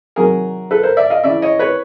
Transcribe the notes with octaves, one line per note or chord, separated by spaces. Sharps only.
C3 D#3 F#3 G#4 A#4
A4 B4
A#4 C5
D5 E5
D#5 F5
C#3 E3 D5 E5
C#5 D#5
B4 C#5